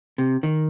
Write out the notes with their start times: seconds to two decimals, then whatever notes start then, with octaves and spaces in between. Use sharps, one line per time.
0.18 C3
0.43 D#3